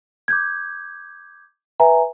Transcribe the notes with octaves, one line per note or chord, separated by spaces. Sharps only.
D6 G6 G#6
B4 E5 G#5 A#5